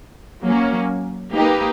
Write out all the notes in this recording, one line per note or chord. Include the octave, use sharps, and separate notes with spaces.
F#3 A#3 C#4
A#3 D#4 G4 B4